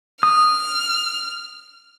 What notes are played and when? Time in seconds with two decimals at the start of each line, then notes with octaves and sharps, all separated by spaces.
0.23 D#6 F6